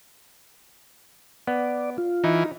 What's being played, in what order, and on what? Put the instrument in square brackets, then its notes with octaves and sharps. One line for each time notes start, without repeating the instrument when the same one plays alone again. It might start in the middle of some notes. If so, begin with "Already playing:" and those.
[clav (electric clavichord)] B3 [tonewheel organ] D5
[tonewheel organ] F4
[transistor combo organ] E3 [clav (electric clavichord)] D#4